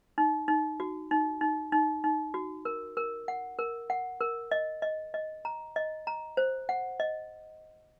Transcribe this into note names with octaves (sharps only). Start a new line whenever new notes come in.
D#4
D#4
F#4
D#4
D#4
D#4
D#4
F#4
A#4
A#4
F#5
A#4
F#5
A#4
D#5
D#5
D#5
A#5
D#5
A#5
C5
F#5
D#5